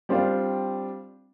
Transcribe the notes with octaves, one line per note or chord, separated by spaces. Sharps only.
G3 C4 D4 F4